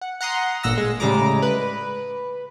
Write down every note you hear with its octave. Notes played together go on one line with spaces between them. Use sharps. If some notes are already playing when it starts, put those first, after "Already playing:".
F#5
F#5 A#5 C6 D#6
G1 A#2 F#5 E6 A#6
G#3
A2 C#3 G3 G#3 A#5 D6
B4